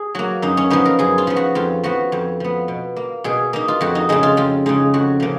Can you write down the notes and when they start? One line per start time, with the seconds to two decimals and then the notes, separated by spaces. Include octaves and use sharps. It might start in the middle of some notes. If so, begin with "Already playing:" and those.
Already playing: G#4
0.15 F#3 A#3 F#4
0.42 F#2 D#4
0.57 C#4
0.70 F3 B3 D#4
0.85 A#4
0.99 F#2 G#4
1.18 F4
1.27 F3 B3
1.36 F#4
1.55 F2 F4
1.84 F3 B3 F#4
2.12 F2
2.40 F3 B3
2.68 B2
2.96 A#3
3.24 B2 G#4
3.53 A#3 D#4
3.68 F4
3.81 F2 F#4
3.95 D#4
4.09 C#3 G#3 D#4
4.23 F4
4.37 F2 F4
4.66 C#3 G#3 D#4
4.94 F2 F#4
5.20 C#3 F3 A#3